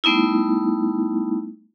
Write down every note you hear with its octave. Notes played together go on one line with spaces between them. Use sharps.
G3 A3 B3 D#4 E4